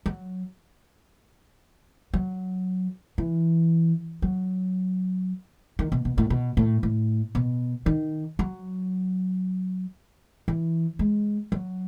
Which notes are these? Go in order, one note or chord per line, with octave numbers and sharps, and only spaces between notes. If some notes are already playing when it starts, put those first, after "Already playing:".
F#3
F#3
E3
F#3
D#3
B2
B2
A2
B2
A2
A2
B2
D#3
F#3
E3
G#3
F#3